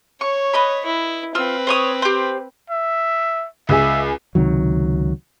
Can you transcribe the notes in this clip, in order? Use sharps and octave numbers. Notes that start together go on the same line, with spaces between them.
C#5 C#6
B4 D#5 B5
E4
C4 F4 B4 E6
C5 C#5 D#6
G4 C5
E5
C#2 G#4 E5
C#2 C3 D#3 F#3